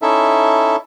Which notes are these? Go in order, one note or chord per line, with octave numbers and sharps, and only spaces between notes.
C#4 D#4 E4 A4 E5